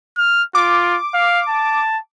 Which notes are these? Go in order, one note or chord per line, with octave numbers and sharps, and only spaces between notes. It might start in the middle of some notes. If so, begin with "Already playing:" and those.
F6
F4 D6
F5
A5